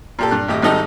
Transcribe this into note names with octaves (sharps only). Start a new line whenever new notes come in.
A#2 G4 A4
G2 F#6
G#1 A2 G4 D#5
G#1 G#2 G3 D#4 A4 D#5